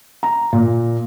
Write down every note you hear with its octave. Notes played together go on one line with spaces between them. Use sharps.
A#5
A#2